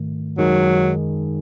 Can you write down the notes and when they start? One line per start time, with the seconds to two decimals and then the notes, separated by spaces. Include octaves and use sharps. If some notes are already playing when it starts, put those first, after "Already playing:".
Already playing: G#2 D#3 A3
0.38 F#2 D#3 F#3 G#3 D#4 G#4